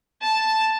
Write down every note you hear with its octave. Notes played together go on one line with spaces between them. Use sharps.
A5